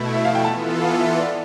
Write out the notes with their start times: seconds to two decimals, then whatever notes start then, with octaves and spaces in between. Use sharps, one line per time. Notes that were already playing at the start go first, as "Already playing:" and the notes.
Already playing: B2 A3 E4
0.15 E5
0.25 F5
0.35 G5
0.44 E3 B3 F4 A4 A5
0.82 F5
1.01 E5
1.19 D5